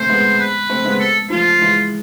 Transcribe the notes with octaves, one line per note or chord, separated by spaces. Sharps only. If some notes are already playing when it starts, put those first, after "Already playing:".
Already playing: A3 C4 C5
G#3 B3
B4
A3 C4
G#3 B3
A4
F3 A3 F4
E3 G#3